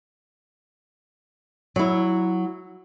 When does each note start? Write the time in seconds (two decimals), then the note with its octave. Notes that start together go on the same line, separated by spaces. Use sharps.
1.76 F#3 E4